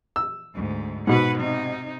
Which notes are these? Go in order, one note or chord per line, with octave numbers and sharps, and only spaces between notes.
E6
D2 G#2
G#2 B2 B4 F#5
C3 D#4